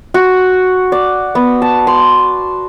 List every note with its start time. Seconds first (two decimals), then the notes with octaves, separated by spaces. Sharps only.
0.14 F#4
0.92 D5
1.35 B3
1.62 A5
1.87 C6